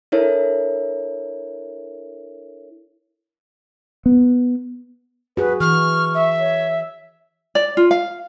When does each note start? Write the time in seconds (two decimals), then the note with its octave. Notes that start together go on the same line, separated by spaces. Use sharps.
0.12 D4 E4 A4 A#4 C#5 E5
4.06 B3
5.37 F#4 G#4 B4
5.60 E3 C#6 F6
6.14 E5
6.39 C#5
7.55 D5
7.77 F4
7.91 F5